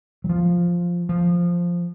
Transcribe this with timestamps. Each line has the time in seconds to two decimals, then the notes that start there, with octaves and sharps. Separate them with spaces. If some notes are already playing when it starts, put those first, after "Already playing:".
0.24 F#3
0.29 F3
1.09 F3